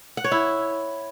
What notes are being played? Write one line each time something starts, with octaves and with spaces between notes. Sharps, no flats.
F#5
C#5
E4